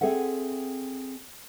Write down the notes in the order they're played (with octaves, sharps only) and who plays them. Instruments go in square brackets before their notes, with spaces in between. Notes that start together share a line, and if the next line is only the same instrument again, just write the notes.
[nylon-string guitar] C4 G#4 A4 E5 F#5